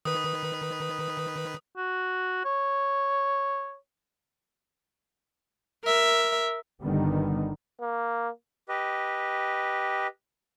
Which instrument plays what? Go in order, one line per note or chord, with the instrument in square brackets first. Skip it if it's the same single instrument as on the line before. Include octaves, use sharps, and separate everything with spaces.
[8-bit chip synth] D#3 B4 [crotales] D#6
[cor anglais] F#4
C#5
[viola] A#4 E5
[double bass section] G1 D3 D#3 G3 B3
[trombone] A#3
[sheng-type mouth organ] G4 B4 D#5